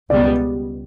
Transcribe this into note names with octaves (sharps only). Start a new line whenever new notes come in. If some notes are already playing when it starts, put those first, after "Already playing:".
C#2 B2 G3 B3 D5